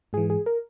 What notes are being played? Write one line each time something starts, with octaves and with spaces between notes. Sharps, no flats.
G#2 E3 G#4
G#4
A#4